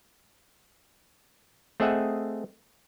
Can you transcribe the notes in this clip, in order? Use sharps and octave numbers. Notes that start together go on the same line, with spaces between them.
A3 C4 G#4 D#5 E5 F#5